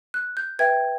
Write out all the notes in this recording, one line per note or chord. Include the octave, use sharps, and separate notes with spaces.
F#6
G6
B4 E5 G5 G#6